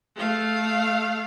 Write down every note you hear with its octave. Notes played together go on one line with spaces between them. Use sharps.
A3 F5